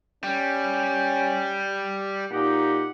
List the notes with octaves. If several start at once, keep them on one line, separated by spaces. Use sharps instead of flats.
G3 C#4 G5
A#2 D#4 G4 F#5